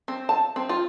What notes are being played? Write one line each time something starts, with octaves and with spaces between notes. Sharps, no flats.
C4
A5
C4
F4